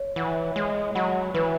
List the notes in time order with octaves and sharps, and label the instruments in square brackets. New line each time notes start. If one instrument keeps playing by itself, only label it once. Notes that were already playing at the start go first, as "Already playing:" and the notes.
Already playing: [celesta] C#5
[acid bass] E3 [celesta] F#5 B5
[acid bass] G#3 [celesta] C#5
[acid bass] F#3 [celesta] F#5 B5
[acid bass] E3 [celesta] B4